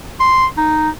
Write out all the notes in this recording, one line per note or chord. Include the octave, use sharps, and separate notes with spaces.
C6
D#4